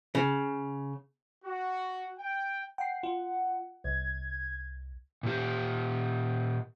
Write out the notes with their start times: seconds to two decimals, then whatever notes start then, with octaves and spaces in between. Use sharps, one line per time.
0.15 C#3
1.45 F#4
2.19 G5
2.78 F#5 G5 C7
3.03 F4
3.84 C2 G#6
5.23 A#2 G4